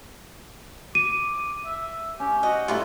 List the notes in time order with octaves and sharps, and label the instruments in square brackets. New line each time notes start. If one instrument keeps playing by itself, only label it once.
[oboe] D6 [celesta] D#7
[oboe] E5
[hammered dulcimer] C#4 [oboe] G4
[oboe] F#4 [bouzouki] D#5
[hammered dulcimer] A2 E4 A#5 [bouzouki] G3 F4